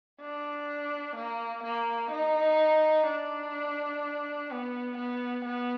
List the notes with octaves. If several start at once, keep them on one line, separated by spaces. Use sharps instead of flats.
D4
A#3
A#3
D#4
D4
B3
B3
B3